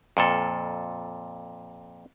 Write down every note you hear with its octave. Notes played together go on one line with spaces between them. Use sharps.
F2 A#2 A4